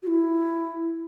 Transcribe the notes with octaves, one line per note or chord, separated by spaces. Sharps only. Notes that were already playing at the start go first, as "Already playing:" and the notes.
F#4
E4